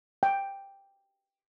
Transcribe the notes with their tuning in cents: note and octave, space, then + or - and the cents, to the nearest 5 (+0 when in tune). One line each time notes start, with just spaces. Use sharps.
G5 +5